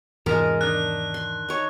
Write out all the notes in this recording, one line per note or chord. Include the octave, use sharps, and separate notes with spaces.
E2 G#2 C3 F3 G#3 A#4
D#3 D4 F#6
C6
D#4 C#5